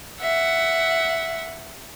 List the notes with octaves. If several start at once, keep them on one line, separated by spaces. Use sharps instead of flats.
E5 F#5